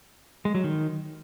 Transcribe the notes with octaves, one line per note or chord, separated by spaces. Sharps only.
G#3
F#3
D#3